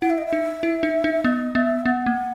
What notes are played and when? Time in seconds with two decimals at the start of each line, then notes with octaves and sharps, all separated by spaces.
0.02 E4 F#5
0.10 E5
0.18 D#5
0.27 E5
0.33 D#4
0.63 E4
0.83 D#4
1.04 D#4
1.24 B3 D#5
1.55 B3 E5
1.86 B3 F#5
2.06 A#3